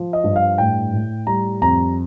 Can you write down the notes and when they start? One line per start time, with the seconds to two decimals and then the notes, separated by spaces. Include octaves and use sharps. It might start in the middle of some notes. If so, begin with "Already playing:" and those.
Already playing: F3
0.13 D#5
0.24 G2
0.36 F5
0.58 A2 G5
0.93 A2
1.27 G3 A#5
1.61 F2 A#5